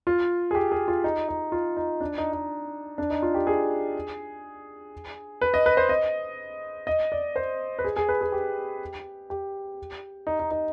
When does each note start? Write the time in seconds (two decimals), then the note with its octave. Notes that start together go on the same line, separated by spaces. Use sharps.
0.07 F4
0.51 G#4
0.55 G4
0.72 G#4
0.88 F4
1.04 D#4
1.29 D#4
1.52 F4
1.77 D#4
2.01 D4
2.18 D#4
2.33 D#4
2.98 D4
3.10 D#4
3.22 F4
3.34 G4
3.47 G#4
5.41 B4
5.54 D#5
5.66 B4
5.77 C5
5.89 D#5
6.87 D#5
7.12 D5
7.36 C5
7.79 B4
7.84 G#4
7.96 G#4
8.09 B4
8.21 G#4
8.32 G4
9.30 G4
10.27 D#4
10.40 D#4
10.51 D#4